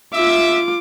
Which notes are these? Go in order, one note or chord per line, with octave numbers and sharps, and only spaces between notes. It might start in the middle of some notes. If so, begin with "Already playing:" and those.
F4 E5 D6